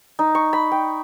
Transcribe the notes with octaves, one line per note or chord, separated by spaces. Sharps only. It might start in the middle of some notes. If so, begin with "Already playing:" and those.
D#4
C#6
B5
G5